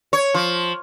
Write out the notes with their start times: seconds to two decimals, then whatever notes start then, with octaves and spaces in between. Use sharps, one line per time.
0.13 C#5
0.34 F3